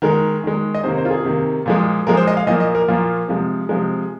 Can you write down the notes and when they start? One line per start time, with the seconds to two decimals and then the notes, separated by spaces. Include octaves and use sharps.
0.02 D#3 G#3 A#4
0.44 D#3 G#3
0.74 D#5
0.84 C3 D#3 A#3 C5
0.98 C5
1.05 F4
1.11 G#4
1.24 C3 D#3 A#3
1.66 A#2 F3 G#3
2.07 A#2 F3 G#3 A#4
2.17 C5
2.27 D#5
2.37 F5
2.47 A#2 F3 A#3 D#5
2.60 D#5
2.75 A#4
2.88 A#2 F3 A#3 F4
3.28 C3 F3 G#3
3.69 C3 F3 G#3